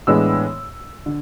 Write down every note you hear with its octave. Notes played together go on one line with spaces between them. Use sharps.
A2 E3 G#3 B3 D4 E6
D3